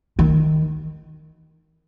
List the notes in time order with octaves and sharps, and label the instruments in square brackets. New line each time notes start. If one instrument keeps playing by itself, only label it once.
[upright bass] D#3